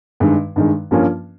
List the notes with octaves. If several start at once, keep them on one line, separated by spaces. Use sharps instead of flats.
G2 D#3 G#3
G2 D#3 G#3
G2 F3 A#3 C#4 F4